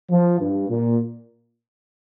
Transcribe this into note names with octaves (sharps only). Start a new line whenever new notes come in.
F3
G2
A#2